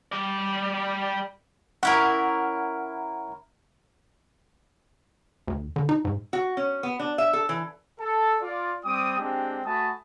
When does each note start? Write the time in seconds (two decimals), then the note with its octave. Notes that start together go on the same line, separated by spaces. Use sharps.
0.12 G3 D5
1.83 C#4 E4 A#4 F#5
5.47 D2
5.76 D3
5.89 D#4
6.05 G#2
6.33 F#4
6.57 C#4
6.83 B3
7.00 D4
7.18 E5
7.33 A4
7.49 E3
8.00 A4
8.42 F4 D5
8.85 G3 C4 G5 D6 D#6
9.19 G#3 C4 D4 G4
9.65 A3 F#4 G#5 A5 B5 D#6